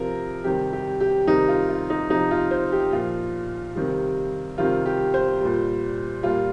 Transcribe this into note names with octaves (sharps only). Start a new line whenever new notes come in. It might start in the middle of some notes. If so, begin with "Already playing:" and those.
Already playing: C3 F3 A#4
C3 D#3 G3 G4
G4
G4
C3 D#3 G3 D#4
F4
F4
D#4
C3 F3 D#4
F4
C5
G4
A#2 F3 F4
C3 D#3 G3
C3 D#3 G3 F4
G4
C5
A#2 G3
A#2 G3 F4